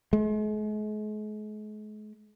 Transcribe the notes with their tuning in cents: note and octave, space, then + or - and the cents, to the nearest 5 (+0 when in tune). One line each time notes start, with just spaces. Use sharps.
G#3 +40